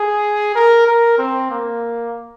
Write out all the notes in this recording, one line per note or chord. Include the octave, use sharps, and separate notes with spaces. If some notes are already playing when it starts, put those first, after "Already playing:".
Already playing: G#4
A#4
A#4
C4
A#3